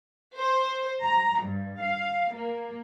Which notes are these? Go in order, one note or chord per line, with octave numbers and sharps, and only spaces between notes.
C5
A#5
G2
F5
A#3